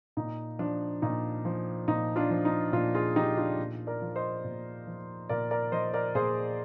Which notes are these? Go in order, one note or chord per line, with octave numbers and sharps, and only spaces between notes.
A#2 D#4
F3 D4
A#2 D#4
F3
A#2 D#4
D4 F4
F3
D#4
A#2 D4 F4
F4 G#4
F3 D#4 G4
D4 F4
A#2
A#4 D5
F3
C5 D#5
A#2
F3
A#2 A#4 D5
A#4 D5
F3 C5 D#5
A#4 D5
A#2 G#4 C5